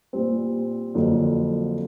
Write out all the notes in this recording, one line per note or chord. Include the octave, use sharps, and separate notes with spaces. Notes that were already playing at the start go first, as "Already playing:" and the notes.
A#2 G3 C4
F2 D3 F#3 A#3